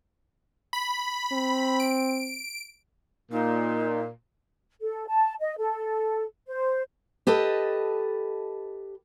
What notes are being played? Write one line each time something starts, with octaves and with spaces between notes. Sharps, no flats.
B5
C4
D7
A#2 D#4
A4
A5
D#5
A4
C5
G4 A4 B4 D#5 A5